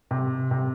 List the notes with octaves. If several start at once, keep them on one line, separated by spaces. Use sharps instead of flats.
C3
C3